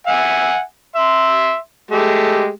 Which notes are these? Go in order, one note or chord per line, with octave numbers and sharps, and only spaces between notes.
E5 F#5 G#5
E5 C6
G#3 A3 G4